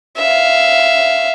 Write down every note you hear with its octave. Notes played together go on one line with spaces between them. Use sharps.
E5 F5